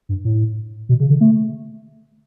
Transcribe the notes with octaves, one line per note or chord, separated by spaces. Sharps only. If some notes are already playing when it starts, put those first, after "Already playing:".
G2
A2
B2
C#3
D3
A3